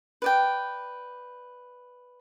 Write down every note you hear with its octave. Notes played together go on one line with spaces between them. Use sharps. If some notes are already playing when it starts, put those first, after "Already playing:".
B4 D5 G5